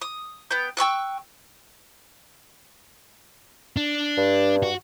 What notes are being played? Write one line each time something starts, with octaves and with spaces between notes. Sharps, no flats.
D#6
B3 G5 G6
G5 C#6 E6 F#6
D4
G2
F#4